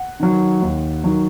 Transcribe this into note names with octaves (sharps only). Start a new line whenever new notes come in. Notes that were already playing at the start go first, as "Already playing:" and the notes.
Already playing: F#5
D#3 F#3
D#2
D#3 F#3